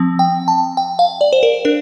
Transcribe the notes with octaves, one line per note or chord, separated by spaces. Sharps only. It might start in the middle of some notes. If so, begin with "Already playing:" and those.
Already playing: F3 C4
G5
A5
G5
F5
D5
C5
A#4
D4 A#4